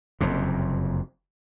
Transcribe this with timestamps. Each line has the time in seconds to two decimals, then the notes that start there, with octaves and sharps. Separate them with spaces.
0.21 F#1 F2 C3